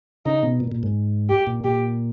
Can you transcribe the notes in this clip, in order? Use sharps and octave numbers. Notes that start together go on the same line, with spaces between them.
C#3 D#4
B2
A#2
A#2
G#2
G4
A#2
A#2 G4